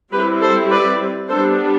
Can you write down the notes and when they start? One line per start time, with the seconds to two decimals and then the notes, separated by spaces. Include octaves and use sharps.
0.12 G3 C4 E4 G4 B4
0.41 A4 C5
0.70 B4 D5
1.29 G3 B3 D4 A4 C5